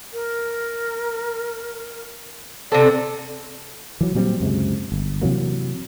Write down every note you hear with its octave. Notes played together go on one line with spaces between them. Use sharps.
A#4
C3 C4 A4 D5
E3 F#3
A#2 F#3 G3 C4
C#2 F#2 C3 G#3
G1
C3 E3 F#3 A#3